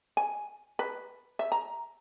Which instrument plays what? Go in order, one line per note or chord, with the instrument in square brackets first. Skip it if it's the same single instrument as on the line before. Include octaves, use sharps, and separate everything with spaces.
[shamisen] G#5
B4
E5
A#5